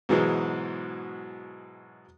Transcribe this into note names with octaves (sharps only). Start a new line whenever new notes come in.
G#2 B2 E3 F#3 G#3